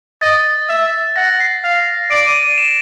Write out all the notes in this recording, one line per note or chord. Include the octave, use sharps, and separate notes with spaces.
D#5 A6
E5
F#5 A#6
C7
F5
D5 D7
D#7
D#7
E7